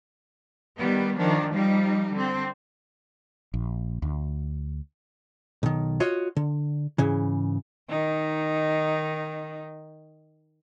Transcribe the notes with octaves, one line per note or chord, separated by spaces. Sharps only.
D#3 G3 B3
D#3 F3 D4
F3 G3 D#4
D3 C4
A#1
D2
B1 D#3
F4 F#4 C#5 D#5
D3
G#2 C#3 E3
D#3 D#4